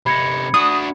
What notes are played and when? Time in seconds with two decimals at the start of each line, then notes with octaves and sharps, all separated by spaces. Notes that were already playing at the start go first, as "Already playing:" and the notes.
0.06 C3 D#4 B5 G#6 C#7
0.54 D4 F#4 D#6